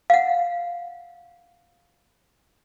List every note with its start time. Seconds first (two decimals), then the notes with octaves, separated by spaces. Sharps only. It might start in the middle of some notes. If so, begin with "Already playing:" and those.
0.10 F5 F#5